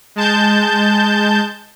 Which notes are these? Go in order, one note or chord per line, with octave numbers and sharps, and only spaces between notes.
G#3 A5 G6